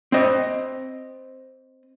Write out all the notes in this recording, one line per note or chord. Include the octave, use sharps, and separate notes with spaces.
C4 D#5